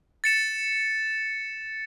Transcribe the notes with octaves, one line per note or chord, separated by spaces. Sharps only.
A6 C#7 E7